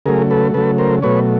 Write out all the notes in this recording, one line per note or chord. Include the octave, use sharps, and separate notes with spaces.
C#3 F#3 A3 G#4 A#4
A4 B4
C#3 F#3 A3 A4 B4
A#4 C5
B2 F#3 A3 B4 C#5